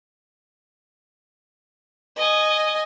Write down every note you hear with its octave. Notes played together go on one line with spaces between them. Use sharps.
D#5 G#5